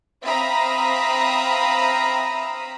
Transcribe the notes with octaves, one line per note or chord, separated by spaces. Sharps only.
C4 E5 F5 A#5 B5 D#6